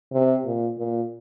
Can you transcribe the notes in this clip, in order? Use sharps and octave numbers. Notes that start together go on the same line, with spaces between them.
C3
A#2
A#2